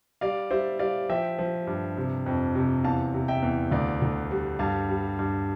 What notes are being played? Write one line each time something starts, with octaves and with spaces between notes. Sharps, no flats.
G3 D5 F5
G3 C5 E5
G3 D5 F5
F3 E5 G5
F3
G2
C3
F2
C3
E2 F5 A5
C3
E5 G5
E2
D2 D5 F5
D2
G3
G2 F5 A5
G3
G2